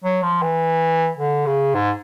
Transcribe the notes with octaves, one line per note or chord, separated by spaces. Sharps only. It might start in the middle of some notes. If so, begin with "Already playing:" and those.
F#3
F3
E3
D3
C#3
G#2